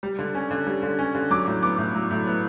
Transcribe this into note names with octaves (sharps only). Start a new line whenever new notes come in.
G3
D3
C#4
D3
G3
D3
C#4
D3
F#3 D6
A2
B3 D6
A2
F#3
A2
B3